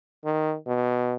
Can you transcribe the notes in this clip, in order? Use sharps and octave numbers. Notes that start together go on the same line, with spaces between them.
D#3
B2